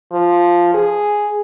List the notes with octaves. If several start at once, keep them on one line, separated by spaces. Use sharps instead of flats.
F3
G#4